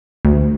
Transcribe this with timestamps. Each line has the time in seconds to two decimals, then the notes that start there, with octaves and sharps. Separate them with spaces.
0.25 D2